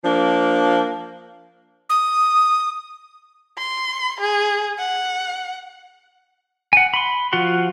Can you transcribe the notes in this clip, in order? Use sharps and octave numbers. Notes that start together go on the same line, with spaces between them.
F3 A#3 D4
D#6
C6
G#4
F#5
F#5 G#5
B5 C6
F3 F4 F#4 F#5 C6